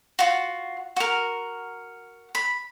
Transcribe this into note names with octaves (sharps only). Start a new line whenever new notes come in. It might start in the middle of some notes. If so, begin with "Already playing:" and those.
F4 F#4
F#4 A#4
B5